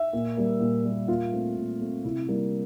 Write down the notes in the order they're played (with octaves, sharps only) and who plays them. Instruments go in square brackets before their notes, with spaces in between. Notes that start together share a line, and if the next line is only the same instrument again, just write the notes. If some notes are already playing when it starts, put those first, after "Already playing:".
Already playing: [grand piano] E5
A#2
G3 A#3
A#2
G3 A#3
A#2 F4
A3 C4
A#2
A3 C4
C3 E4
G3 A#3